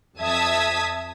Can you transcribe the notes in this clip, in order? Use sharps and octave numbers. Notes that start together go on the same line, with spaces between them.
F2 E5 A5 D#6 G#6 B6